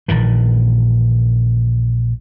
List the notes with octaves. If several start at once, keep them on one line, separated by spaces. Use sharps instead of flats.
A#1 A#2 D#3 E3